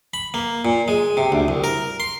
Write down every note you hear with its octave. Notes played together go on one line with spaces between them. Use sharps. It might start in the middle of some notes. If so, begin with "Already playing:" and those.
B5
A#3
A#2
G#3
C3
D2
C2
A#4
C6